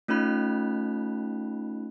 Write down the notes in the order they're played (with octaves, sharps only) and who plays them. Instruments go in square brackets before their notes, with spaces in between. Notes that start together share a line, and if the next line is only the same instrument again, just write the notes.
[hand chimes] A3 C#4 D#4 F4 B5 F#6